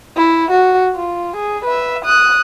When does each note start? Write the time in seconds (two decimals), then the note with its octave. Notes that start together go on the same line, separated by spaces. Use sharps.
0.17 E4
0.51 F#4
0.96 F4
1.36 G#4
1.65 B4 E5
2.05 D#6 F#6